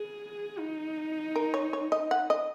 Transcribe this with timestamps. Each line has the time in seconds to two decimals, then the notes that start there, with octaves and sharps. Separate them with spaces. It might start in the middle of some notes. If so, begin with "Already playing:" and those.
Already playing: G#4
0.60 D#4
1.36 A#4
1.54 C#5
1.73 C#5
1.92 D#5
2.11 F#5
2.30 D#5